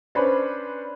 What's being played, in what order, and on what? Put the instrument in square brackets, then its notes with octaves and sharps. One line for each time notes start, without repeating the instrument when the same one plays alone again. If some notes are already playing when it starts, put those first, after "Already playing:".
[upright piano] C#4 D4 B4 C5 B5